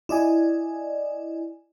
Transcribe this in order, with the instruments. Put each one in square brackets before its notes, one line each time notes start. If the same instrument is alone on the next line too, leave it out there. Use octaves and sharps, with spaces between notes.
[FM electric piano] E4 D5 D#5 G#5